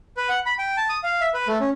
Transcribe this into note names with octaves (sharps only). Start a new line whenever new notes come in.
B4
F#5
B5
G5
A5
D#6
F5
E5
B4
A3
C#4